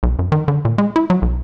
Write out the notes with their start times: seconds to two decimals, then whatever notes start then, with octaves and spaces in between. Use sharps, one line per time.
0.03 B1
0.19 F#2
0.32 D#3
0.48 D3
0.65 A#2
0.78 G#3
0.96 E4
1.10 F#3
1.22 B1